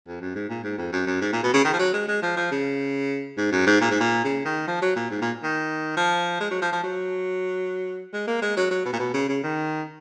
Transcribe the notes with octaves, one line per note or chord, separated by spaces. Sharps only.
F2
F#2
G#2
A#2
G#2
F2
F#2
F#2
G#2
A#2
B2
C#3
D#3
F3
F#3
G#3
G#3
F3
F3
C#3
G#2
F#2
G#2
A#2
G#2
A#2
C#3
D#3
F3
F#3
A#2
G#2
A#2
D#3
F3
G#3
F#3
F3
F3
F#3
G#3
A#3
G#3
F#3
F#3
B2
A#2
B2
C#3
C#3
D#3